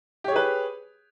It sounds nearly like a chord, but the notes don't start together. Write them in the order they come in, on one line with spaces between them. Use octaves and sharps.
G4 C#5 G#4 B4